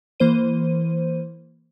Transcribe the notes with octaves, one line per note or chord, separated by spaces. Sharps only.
E3 A#3 C5 D#7